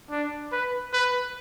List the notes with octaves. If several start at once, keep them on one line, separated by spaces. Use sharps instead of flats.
D4
B4
B4